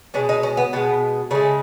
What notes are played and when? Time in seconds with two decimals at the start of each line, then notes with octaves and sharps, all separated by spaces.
0.14 B2 G#3 C#4
0.29 D#4
0.43 C#4
0.57 B3
0.73 B2 G#3 B3
1.31 C#3 G#3 A3